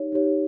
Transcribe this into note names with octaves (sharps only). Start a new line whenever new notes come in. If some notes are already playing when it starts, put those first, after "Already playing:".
Already playing: D#4 G4 C#5
D#4 G4 C#5